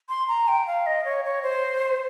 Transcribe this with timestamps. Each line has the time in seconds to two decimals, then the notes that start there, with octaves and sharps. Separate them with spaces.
0.09 C6
0.28 A#5
0.48 G5
0.67 F5
0.86 D#5
1.05 C#5
1.25 C#5
1.43 C5